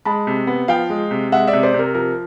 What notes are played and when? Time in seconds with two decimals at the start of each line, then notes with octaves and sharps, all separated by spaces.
0.05 G#3 A5 B5
0.27 C3
0.47 B3
0.68 F3 F5 G5
0.90 G#3
1.11 C3
1.32 G#3 E5 F#5
1.47 D5 E5
1.53 C3
1.63 C5 D5
1.74 C3 A#4
1.94 F3 A#4